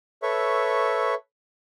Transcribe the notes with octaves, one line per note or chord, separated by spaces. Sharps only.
A4 B4 C#5 E5 C#6